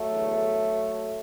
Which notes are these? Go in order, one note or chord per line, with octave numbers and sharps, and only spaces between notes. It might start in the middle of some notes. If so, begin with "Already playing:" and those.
Already playing: F#3 A3
E2 D3